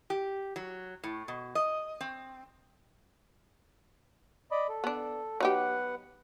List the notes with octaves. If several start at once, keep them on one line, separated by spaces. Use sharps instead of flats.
G4
F#3
A2
B2
D#5
C4
D5 D#5 B5
A4
B3 D4
F#3 B3 D#4 G4 B4 F#5